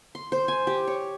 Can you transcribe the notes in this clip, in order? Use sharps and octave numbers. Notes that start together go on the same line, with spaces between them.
C6
C5
G#5
G4
C#5